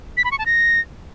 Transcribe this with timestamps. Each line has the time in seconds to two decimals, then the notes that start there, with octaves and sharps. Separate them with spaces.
0.17 B6
0.24 B5
0.32 C#6
0.39 A5
0.46 A#6